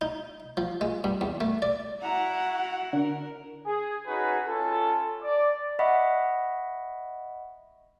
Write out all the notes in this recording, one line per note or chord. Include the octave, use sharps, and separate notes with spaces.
D#4
F3
G#3
G2
E2
A3
D5
E4 F#4 F#5 A#5
D3 A#4
G#4
C#4 D#4 F#4 G#4 B4
C#4 F4 A4
D5
D#5 E5 F#5 B5 C#6